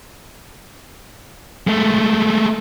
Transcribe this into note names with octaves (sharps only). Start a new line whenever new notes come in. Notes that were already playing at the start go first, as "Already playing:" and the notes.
G#3 A3